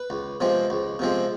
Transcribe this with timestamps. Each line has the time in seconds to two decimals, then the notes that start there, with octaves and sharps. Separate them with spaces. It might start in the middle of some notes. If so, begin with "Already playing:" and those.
Already playing: B4
0.10 C#2
0.40 C3 F3 G#3 C4
0.70 C#2
0.99 C3 F3 G#3 C4